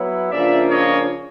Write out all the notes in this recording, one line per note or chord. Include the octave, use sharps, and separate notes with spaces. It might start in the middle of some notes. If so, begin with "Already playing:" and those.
Already playing: F#3 B3 E4
C#3 F3 A#3 D4 F4 D5 E5
C#5 D#5